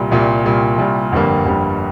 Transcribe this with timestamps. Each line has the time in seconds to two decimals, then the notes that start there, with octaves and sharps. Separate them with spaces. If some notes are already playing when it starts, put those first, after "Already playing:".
Already playing: C2 A#2 G3
0.11 C2 A#2 G3
0.45 C2 A#2 G3
0.78 C2 A#2 G3
1.12 G1 F2 D3 G3 A#3
1.45 G1 F2 D3 G3 A#3